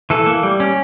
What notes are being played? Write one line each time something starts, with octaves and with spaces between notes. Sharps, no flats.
E3 A4
A#3
G3
C#4